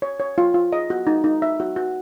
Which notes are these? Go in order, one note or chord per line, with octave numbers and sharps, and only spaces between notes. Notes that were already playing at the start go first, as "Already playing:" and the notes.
C#5
C#5
F4
F4
D#5
F#4
D#4
D#4
E5
F#4
F#4